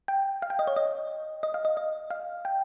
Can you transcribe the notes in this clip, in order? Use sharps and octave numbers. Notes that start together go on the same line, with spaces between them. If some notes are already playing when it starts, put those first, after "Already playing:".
G5
F5
G5
D#5
C#5
D#5
D#5
F5
D#5
D#5
F5
G5